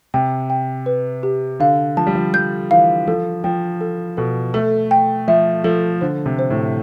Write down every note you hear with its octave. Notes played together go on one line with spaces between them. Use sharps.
C3 G5
G5
B4
G4
D3 F5
F3 A5
G3
F3
F3 G6
E3 F5
F3 A4
F3 G5
A4
B2 A4
A3 A4
G5
F3 E5
F3 A4
D3 C5
C3
C5
A2